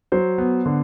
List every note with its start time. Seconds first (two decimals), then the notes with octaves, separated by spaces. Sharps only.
0.12 F#3 C5
0.38 B3
0.66 D3